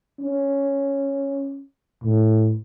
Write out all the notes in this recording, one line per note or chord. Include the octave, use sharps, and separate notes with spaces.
C#4
A2